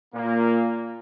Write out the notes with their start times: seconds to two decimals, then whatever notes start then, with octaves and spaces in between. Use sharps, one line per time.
0.14 A#2 A#3